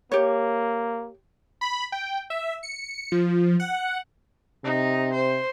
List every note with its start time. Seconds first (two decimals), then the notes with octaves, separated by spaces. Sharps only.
0.12 A#3 G4 C#5
1.61 B5
1.92 G5
2.30 E5
2.63 C#7
3.12 F3
3.60 F#5
4.64 C3 D#4
5.13 C5